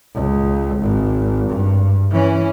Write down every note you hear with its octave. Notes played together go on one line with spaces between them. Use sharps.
C#2
G#1
G2
E3 C#4